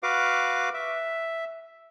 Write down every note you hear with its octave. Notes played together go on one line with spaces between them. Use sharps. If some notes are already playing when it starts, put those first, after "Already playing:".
F#4 B4 F5 D6
E5